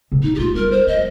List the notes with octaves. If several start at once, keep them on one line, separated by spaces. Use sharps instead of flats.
C3
A#2 D#4
G4
A#3 F4
G3 A#4
C5
F3 D#5